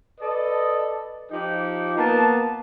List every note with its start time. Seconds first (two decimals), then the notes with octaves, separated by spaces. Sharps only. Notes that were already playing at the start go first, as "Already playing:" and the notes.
0.20 A4 B4 D5 D#5
1.31 F3 D#4 G4
1.97 A#3 B3 A5